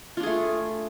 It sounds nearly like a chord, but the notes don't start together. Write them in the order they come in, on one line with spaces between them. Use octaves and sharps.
F4 D4 G#4 A3